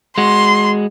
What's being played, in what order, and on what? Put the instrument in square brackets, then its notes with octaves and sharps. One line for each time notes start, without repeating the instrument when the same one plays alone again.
[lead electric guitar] G#3 F#4 [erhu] C6